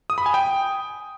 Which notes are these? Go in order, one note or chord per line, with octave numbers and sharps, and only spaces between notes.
D#6
B5
G#5
G5